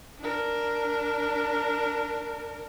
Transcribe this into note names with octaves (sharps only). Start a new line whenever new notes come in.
D4 A#4